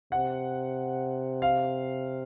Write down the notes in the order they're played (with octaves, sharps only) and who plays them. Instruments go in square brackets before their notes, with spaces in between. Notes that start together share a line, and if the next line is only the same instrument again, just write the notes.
[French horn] C3 [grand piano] F#5
[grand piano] F5